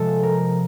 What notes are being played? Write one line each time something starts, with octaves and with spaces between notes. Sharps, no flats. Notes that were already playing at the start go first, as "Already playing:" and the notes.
Already playing: C3 F3 G#3 A4
A#4